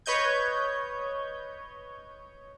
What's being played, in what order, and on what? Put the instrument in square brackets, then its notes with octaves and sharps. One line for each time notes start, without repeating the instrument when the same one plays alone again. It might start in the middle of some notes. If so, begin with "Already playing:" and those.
[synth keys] B4 C#5 D#5 G6 G#6